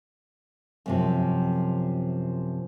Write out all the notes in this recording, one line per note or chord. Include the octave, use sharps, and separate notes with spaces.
F#2 C3 F3